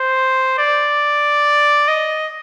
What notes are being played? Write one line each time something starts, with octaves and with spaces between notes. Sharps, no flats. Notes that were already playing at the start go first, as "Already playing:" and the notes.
Already playing: C5
D5
D#5